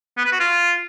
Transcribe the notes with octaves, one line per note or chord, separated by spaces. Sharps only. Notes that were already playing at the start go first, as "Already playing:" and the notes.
B3
B4
F#4
F4